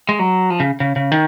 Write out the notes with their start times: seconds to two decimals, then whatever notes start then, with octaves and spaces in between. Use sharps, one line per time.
0.09 G#3
0.19 F#3
0.50 F3
0.60 C#3
0.80 C#3
0.96 C#3
1.12 D#3